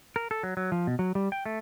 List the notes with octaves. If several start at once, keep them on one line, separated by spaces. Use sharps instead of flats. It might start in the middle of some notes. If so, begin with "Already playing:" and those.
A#4
A4
F#3
F#3
F3
B2
F#3
G3
G5
A3